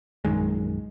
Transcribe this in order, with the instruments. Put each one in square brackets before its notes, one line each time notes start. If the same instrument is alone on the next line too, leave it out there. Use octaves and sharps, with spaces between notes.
[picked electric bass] A#1 F#2 D#3 G#3